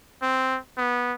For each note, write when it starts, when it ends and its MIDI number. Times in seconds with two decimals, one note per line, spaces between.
0.22 0.58 60
0.77 1.14 59